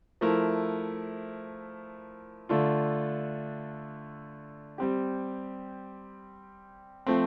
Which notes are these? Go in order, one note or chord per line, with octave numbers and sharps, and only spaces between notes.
F3 A3 E4 A#4
D3 A3 D4 F4
G3 C4 G4
F3 A3 C4